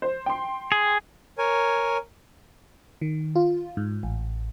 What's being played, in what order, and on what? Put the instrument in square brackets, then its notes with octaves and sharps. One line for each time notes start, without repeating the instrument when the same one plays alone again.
[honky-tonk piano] C5
G5 C6
[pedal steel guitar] G#4
[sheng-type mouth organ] A#4 C#5 G#5
[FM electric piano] D#3
F4
G#2
A1